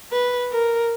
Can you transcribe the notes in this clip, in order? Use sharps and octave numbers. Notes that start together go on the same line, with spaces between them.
B4
A#4